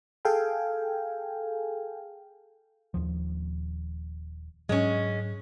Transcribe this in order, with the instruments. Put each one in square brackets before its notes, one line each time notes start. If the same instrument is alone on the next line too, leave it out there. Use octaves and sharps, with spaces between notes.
[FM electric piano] G#4 A4 F5 G5 G#5
[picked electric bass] D#1 D#2 F3
[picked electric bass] G#2 F#3 [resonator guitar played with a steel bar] G#3 C#4